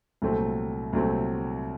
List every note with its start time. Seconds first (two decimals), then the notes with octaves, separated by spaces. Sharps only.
0.22 C2 A#2 F#3 A3 C4
0.93 C2 A#2 F#3 A3 C4